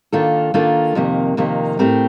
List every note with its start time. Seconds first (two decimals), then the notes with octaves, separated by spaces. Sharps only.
0.13 D#3 A#3 D4 F4 A4
0.54 D#3 A#3 D4 F4 A4
0.95 F2 C3 D#3 A#3
1.37 F2 C3 D#3 A#3
1.79 A2 A3 C4 G4 A#4